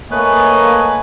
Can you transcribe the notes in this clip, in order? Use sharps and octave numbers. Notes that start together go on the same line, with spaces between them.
A3 A#3 B4 C#5 D#5 G#5